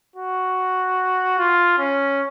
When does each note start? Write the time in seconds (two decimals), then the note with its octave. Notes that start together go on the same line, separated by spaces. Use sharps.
0.16 F#4
1.38 F4
1.78 C#4